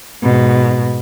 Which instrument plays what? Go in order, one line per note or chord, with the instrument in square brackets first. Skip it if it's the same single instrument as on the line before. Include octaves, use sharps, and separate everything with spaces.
[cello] G#2 B2